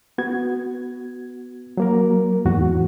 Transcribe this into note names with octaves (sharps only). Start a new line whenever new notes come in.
B3 F#4 G#6
F#3 A#3 A#4
E2 G#2 F#4